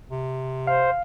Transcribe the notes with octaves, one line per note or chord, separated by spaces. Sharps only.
C3
C5 F5